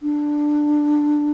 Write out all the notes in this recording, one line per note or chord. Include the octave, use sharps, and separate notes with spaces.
D4